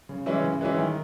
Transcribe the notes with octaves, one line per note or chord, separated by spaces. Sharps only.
C#3
E3 G#3 C#4 E4
C#3
E3 G#3 C#4 E4
D#3